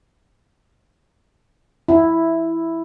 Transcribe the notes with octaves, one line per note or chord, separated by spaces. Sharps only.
E4